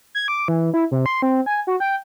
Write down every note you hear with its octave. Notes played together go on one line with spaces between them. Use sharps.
G#6
D6
E3
E4
C3
C6
C4
G#5
F#4
G5